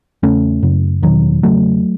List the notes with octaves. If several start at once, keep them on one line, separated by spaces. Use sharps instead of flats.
E2 C#3 A3 C#4
F#2 C#3
E2 B2 D#3 F#3
E2 C#3 F#3 A3